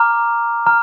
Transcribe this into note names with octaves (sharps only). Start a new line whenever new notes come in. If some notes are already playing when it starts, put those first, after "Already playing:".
Already playing: A#5 D6 F6
A#5 F6